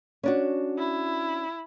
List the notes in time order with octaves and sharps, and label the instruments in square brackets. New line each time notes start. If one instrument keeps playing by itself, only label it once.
[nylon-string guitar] C#4 D4 F#4
[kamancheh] E4